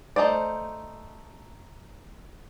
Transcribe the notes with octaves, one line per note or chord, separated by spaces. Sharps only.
A3 D#4 C5 D5